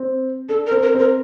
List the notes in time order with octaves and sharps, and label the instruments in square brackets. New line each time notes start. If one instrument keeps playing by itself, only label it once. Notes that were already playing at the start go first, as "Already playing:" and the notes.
Already playing: [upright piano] C4
[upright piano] D4 [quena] A4
[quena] A#4
[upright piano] C4
[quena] A#4
[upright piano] C4 [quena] A#4